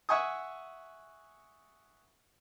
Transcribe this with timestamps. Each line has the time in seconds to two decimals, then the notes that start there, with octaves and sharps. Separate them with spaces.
0.09 E5 F#5 G#5 C#6 D#6